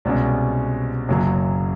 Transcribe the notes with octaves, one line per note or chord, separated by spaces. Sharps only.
C2 B2 G#3 C#4
F#1 F#2 C#3 F#3